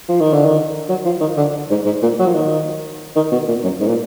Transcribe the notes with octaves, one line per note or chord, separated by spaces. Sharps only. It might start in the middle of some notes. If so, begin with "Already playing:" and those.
F3
D#3
D3
D#3
F#3
F3
D#3
D3
G#2
G#2
A#2
F#3
F3
D#3
D#3
B2
A#2
F#2
G#2
A#2